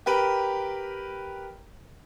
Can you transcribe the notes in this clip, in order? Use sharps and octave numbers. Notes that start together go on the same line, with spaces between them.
G4 A#4 B4 G5